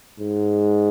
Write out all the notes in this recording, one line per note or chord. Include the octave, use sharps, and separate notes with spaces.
G#2